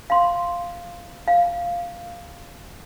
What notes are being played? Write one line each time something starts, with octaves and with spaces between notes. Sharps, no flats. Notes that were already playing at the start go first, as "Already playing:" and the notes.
F5 C6
F5